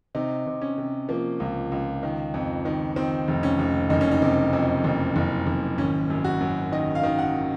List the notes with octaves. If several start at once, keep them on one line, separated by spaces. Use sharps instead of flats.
C3 D#4
C3
C#4
C3
F3 A#3
C#2
C#2
D#3
F2
D#3
D#3 C4
F1
C#4
F1
F#1 D#4
C#4
D#4
C3
F2
F#1
F#1
F#1
G#1 C#4
F#2
F#4
F#2
D#3 D#5
F5
D#3
F#5